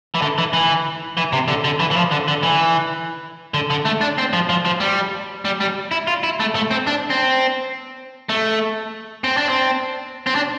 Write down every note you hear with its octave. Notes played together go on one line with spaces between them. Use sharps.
E3
D3
E3
E3
E3
C3
D3
D3
E3
E3
F3
D3
D3
E3
D3
D3
A3
D4
C4
F3
F3
F3
G3
G3
G3
E4
F4
E4
A3
A3
C4
D4
C4
A3
C4
D4
C4
C4
D4